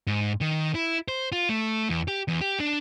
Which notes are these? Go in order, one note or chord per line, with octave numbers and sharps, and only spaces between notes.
G#2
D#3
E4
C5
F4
A3
E2
G4
E2
G4
D4